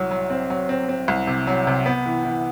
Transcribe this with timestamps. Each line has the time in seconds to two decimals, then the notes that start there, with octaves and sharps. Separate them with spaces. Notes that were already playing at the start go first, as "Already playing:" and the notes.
Already playing: C2 F#3
0.11 F#3
0.30 C4
0.50 F#3
0.69 C4
0.89 C4
1.08 C2
1.27 C3
1.47 F#3
1.67 C3
1.86 B3
2.06 E3
2.25 E3